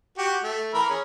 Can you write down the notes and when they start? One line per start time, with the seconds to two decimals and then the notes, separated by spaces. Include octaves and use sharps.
0.18 F#4 G4
0.43 A3
0.74 E3 A#4 B5
0.90 C#4 G#4